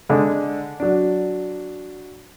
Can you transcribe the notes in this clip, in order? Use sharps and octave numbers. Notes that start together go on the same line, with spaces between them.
D3 G#3
F#3 D4